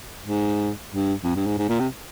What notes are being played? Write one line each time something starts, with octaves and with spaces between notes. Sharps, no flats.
G#2
G2
F2
G2
G#2
G#2
A#2
C3